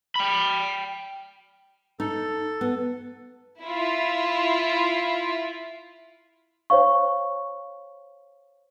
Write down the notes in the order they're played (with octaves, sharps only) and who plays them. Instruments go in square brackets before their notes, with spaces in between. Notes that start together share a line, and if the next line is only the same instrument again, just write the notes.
[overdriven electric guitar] G5 B5
[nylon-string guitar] D#4 [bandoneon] A4
[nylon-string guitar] B3
[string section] E4 F4
[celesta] C5 C#5 F5 C#6